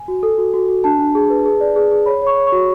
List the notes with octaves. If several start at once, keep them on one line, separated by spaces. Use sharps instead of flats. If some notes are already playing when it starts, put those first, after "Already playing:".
Already playing: G#5
F#4
A4
F#4
F#4
F#4
D4 A5
D4
G#4
B4
G#4
D5
G#4
G#4
C#5 B5
C#5 C#6
C#5
C#6
F#4